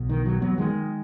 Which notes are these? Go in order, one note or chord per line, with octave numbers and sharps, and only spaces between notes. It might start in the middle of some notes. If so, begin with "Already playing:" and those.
Already playing: B1 B2
D#3
F#3
F#3 B3
D#3 G#3